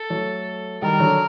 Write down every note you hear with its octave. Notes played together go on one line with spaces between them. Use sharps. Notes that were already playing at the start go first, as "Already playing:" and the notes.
Already playing: A4
F#3 A3
D#3 G3 A#4
D3 F#3